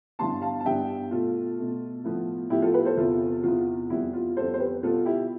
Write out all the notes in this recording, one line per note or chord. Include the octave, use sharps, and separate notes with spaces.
G2 E3 G3 B3 A5 C6
F5 A5
A5
G2 E3 G3 B3 E5 G5
B2 A3 F4 A4
B2 A3
A2 F3 B3
A2 F3 B3 E4 G4
F4 A4
G4 B4
A4 C5
E2 C3 E3 B3 F4 A4
E2 C3 E3 B3 F4
F2 E3 G3 B3 E4
F4
F2 E3 G3 B3 A4 C5
C5
G4 B4
B2 G3 B3 F4 A4
E4 G4